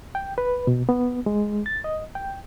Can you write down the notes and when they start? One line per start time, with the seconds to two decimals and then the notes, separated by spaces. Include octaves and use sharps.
0.15 G5
0.38 B4
0.67 B2
0.89 B3
1.26 G#3
1.66 A6
1.84 D#5
2.15 G5